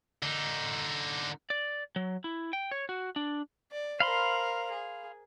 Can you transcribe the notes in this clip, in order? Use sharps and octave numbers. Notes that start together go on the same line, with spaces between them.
D3 D#4
D5
F#3
E4
G5
C#5
F#4
D4
D5
A#4 C5 F5 B5 C6
G#4